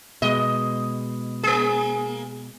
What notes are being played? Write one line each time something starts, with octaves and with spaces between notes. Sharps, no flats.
B2 G#3 D#5
A#3 G#4